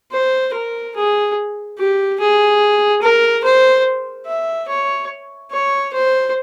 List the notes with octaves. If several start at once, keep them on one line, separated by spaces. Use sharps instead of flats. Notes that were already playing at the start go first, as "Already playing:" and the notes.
C5
A#4
G#4
G4
G#4
A#4
C5
E5
C#5
C#5
C5